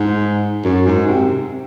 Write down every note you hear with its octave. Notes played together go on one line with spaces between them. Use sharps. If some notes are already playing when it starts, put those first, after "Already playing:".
Already playing: G#2
F#2
G#2
C3